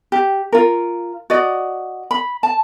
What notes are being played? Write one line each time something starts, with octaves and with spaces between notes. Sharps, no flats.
G4
F4 A#4
F#4 D5 D#5
B5
A5